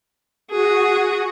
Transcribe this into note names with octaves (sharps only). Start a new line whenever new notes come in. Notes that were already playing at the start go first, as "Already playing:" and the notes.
F#4 G#4